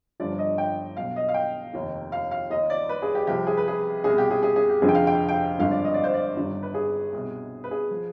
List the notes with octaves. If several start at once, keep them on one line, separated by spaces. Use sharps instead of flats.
G1 G2 F3 D5
D#5
G5
B1 B2 F5
D#5
F5
G5
F1 D#2 D#3
F5
F5
D#2 D#3 D#5
D5
B4
G#4
G4
C2 C3 F3 G4
G#4
B4
G#4
C2 B2 G#4
G4
G#4
G#4
G#4
G4
F1 F2 D3 F3 G#4
G5
F5
G5
G5
G#1 G2 D3 F3 F5
D5
D#5
D5
C5
D5
G1 G2 D#3
B4
G#4
C2 B2
B4
G#4
F3